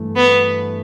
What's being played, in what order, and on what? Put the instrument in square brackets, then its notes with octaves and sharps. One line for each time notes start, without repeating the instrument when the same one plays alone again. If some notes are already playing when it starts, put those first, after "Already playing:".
Already playing: [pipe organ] G2 E3 A3
[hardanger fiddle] B3